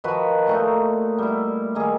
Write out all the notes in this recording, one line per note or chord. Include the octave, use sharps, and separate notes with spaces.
D#3 F3 F#4 B4
A#2 A3 D#4
G3 E4
D#3 A#3 G#4